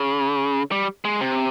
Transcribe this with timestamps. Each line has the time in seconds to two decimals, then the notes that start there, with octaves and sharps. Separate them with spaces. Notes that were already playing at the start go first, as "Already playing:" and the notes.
Already playing: C#3
0.71 G3
1.05 G#3
1.21 C3